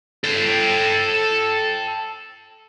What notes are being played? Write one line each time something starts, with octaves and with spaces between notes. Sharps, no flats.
A4 G5